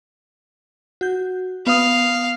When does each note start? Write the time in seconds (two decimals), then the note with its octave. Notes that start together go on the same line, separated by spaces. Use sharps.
1.01 F#4 G6
1.67 B3 F5 D#6